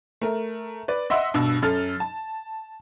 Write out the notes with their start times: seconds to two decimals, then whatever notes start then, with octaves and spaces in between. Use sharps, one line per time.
0.22 A3 A#4
0.88 B4 D5
1.10 D#5 E5 F#5 C6 E6
1.34 G2 B2 E6
1.62 F#2 A4 F6 A6
2.00 A5